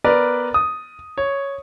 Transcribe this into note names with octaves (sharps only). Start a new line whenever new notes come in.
B3 A#4 B4 D5
D#6
C#5